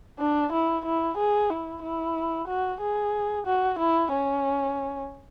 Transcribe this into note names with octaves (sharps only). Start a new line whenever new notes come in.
D4
E4
E4
G#4
E4
E4
F#4
G#4
F#4
E4
C#4